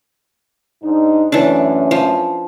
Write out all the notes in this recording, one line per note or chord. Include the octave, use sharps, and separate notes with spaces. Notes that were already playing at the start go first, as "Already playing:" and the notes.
G#2 D4 D#4
F#2 E3 A3 C#4 D4
F3